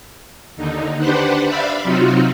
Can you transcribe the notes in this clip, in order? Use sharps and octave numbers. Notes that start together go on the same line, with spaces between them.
D#2 D3 D#4
D4 G4 B4 C5 F#5
D5 E5 F5 B5
C3 F#3 C4 D#4 F4 F#4